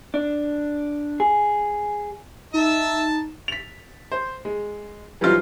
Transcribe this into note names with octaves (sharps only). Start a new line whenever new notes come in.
D4
G#4
D#4 E5 A5
B6 F7
C5
G#3
E3 F#3 G3 C4 D#4 F4